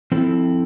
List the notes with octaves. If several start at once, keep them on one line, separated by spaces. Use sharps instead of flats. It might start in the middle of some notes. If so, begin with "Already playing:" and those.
F3 C4 E4 A4